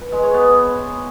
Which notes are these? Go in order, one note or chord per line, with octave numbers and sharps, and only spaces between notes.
B4
G#3
C#5
B3